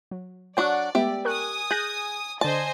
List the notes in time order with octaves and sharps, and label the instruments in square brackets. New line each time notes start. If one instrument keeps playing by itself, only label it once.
[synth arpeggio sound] F#3
[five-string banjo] F#3 D4 F#4 [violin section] D5 [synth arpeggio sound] F#5 A5 C#6
[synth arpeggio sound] G#3 A3 B3 [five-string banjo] G4 E5
[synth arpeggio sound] A#4 C#6 F#6 [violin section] G#5 D#6
[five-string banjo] G#4 [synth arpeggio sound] F#6 G6 A#6
[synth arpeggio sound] D3 D5 [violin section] C5 D#5 G#5 [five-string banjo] A5